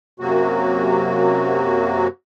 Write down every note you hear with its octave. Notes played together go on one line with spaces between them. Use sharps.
F#2 C3 F#3 A#3 F#4